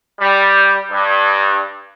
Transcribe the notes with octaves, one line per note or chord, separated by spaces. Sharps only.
G3
G2